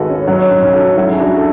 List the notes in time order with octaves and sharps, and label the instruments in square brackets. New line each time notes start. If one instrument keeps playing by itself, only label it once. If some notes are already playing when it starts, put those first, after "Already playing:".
Already playing: [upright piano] G#1 G#3 F#4 G#4 A4 B4
C#4
F#3 C#4
C#4
B1
F#4 A4
F#3 C#4 E4
G#4
D4 F#4
A4